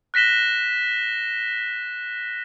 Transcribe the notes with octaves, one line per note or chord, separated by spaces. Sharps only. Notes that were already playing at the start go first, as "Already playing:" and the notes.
F#6 A#6 B6 E7 G7